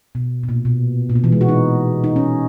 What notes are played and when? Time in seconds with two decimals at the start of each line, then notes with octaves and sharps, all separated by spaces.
0.15 B2
0.43 B2
0.49 A#2
0.65 B2
1.10 A#2
1.15 B2
1.24 E3
1.32 G#3
1.41 F#4
1.49 D#4
2.04 D#4
2.16 C#4